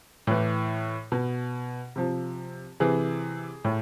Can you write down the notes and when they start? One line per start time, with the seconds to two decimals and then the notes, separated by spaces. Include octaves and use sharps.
0.27 A2 E3
1.12 B2
1.96 C3 F3
2.80 C3 E3 G#4
3.64 A2